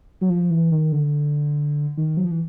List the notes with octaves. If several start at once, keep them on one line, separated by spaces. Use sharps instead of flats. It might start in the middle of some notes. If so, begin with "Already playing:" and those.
F#3
F3
E3
D#3
D3
D#3
F#3
F3
E3